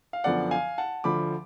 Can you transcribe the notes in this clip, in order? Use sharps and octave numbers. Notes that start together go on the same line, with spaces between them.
F5
F#2 D3 F3 B3 D5 F#5
F5 G#5
F#5 A5
D2 D3 F3 B5 D6